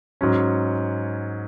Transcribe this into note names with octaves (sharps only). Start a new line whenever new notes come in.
G#2 F#3 C#4